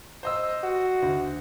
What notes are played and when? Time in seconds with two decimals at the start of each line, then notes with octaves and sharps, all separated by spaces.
0.23 C5 D#5 E6
0.63 F#4
1.02 D2